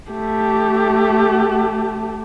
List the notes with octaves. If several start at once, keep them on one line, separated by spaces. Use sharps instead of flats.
A3 G4